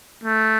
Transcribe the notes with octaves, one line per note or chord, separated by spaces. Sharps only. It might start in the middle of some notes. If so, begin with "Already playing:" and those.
A3